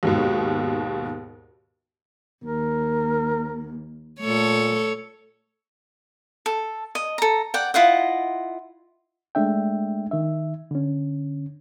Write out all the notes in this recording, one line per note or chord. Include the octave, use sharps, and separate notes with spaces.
D#2 G#2 B2
D#2 A#4
A#2 A3 A4 C#5
A4
D#5
A4 A#5
D5 F#5 G5
E4 F4 D#5 F#5
G#3 A3 D4 E5 G5
D#3 E5
D3 C#4